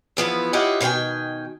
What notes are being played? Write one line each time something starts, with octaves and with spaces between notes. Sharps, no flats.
E2 F3 B3 E4
E4 F4 G4 C#5 D#5 F#5
B2 D#3 C5 G5 G#5